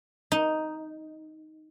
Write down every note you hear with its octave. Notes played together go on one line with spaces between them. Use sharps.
D#4